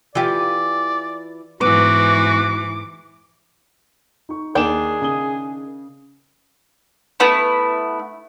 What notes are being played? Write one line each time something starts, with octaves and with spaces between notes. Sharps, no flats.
E3 F4 G4 D5
G#2 E3 B3 F#4 D6
D#4 C#6
D#2 D#3 D4 G#4 G5 E7
C#3 D#6 G7
A3 B3 E4